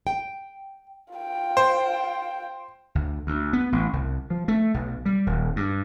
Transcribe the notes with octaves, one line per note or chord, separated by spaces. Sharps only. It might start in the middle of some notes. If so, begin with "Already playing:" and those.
G5
F4 G5
C5
D2
D2
B3
A1
C2
F3
A3
B1
G3
D#1
G2